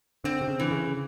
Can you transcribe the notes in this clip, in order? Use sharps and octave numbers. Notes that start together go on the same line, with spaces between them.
D3 C4
C3
C#3
D3 E3
C#3